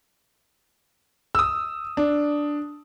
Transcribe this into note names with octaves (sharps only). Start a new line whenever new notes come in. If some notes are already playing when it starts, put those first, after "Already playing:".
D#6 E6
D4